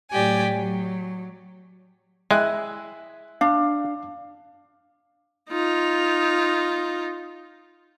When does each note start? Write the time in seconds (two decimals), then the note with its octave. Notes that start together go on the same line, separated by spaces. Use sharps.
0.12 A2 F#3 G4 D5 G5 G#5
0.53 F#3
2.31 G#3 E4 G#5 F#6
3.41 D4 F5
5.50 D#4 F4